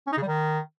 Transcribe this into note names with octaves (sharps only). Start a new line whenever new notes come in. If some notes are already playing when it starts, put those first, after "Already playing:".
C#4
D#4
C#3
G3
D#3